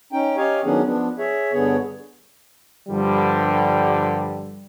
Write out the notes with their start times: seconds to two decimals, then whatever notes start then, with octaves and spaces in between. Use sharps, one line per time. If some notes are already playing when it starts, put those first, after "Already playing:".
0.12 C#4 D#4 G5
0.37 G4 C#5 D#5 F5 G#5
0.64 D#3 F#3 B3 C#4 D4 G#4
0.85 F3 B3 D4
1.18 G#4 C#5 E5
1.53 G2 D3 B3 G#4 C#5
2.88 G2 D3 F3 G3